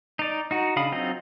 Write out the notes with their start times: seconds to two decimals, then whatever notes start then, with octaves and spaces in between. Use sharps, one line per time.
0.19 D#4 D5
0.51 D#4 F#4
0.76 C#3 D4 F5 B5 D#6
0.92 F#3 C4 D#4 F4 D#5